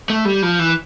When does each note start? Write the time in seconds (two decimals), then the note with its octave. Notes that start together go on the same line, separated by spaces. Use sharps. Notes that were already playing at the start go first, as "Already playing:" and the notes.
0.10 A3
0.25 G3
0.43 F3
0.59 E3